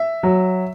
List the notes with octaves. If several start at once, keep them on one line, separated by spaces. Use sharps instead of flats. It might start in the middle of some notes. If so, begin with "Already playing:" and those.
Already playing: E5
F#3